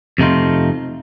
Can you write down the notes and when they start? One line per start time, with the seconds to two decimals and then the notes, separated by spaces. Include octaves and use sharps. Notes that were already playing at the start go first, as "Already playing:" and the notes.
0.18 F2 C3 A3 D#4 F4